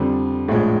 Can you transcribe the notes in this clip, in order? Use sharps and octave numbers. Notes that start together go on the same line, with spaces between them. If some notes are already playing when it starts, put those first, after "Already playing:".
Already playing: F2 D3 G3
A#1 A2 F3 G#3